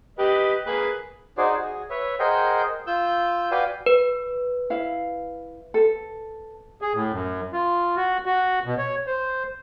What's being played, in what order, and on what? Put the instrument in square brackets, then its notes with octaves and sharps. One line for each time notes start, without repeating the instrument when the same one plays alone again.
[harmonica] G4 B4 D#5
A#3 G#4 B4
[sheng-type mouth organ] D#4 F#4 G#4 C5 D5
F#4 G#4
B4 C#5 E5
G#4 A#4 C5 D#5 F#5 G5
F4 E6 G6
F#4 B4 D5 F5 G5 G#5
[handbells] B4
[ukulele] E4 F5
A4
[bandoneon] G#4
A2
F#2
F4
F#4
F#4
B2
C#5
C5